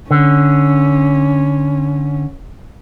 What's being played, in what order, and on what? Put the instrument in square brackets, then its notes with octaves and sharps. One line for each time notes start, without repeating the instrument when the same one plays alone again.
[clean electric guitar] D3 [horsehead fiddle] C#4